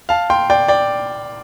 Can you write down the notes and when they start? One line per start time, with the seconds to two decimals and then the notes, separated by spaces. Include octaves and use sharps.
0.09 F5 A5
0.30 G5 C6
0.50 D5 G5
0.68 D5 G5